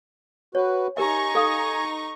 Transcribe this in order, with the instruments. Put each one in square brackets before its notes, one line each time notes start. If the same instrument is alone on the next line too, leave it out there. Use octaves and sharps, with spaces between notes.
[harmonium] F#4 B4 [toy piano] C#5
[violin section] D#4 A#5 C#6 [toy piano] G4 A#4 E5 [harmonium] G#5
[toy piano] A4 F5 D#6